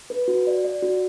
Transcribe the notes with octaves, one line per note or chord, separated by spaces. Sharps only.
B4
F#4
D5
D5
F#4